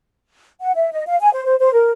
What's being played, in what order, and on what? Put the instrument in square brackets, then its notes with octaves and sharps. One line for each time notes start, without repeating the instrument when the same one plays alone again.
[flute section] F#5
E5
D#5
F5
G#5
C5
C5
C5
A#4